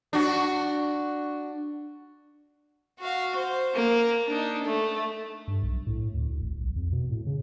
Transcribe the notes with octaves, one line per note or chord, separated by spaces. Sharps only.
D4 F#4
F#4 F5
C5
A#3
D4 D#4
A3
G2
B1
A2
D2
D2
G#1
B1
F2
B2
A2
C#3